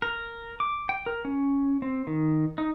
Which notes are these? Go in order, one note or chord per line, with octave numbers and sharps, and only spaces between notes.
A#4
D6
G5
A#4
C#4
C4
D#3
D#4